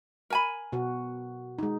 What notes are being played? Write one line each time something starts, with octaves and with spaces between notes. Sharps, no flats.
A#4 G#5 B5
B2 F#4
G#3 D#4